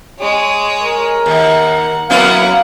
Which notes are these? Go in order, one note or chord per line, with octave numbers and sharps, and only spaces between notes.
G#3 C#5
A#4
D#2 F#5
F#3 A#3 B3 C#4 E4 F5 F#5